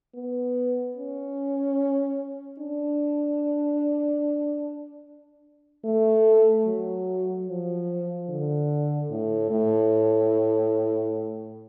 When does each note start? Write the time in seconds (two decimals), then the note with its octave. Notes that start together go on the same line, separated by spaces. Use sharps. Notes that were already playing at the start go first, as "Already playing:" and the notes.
0.15 B3
0.96 C#4
2.59 D4
5.85 A3
6.66 F#3
7.47 F3
8.29 D3
9.10 A2
9.51 A2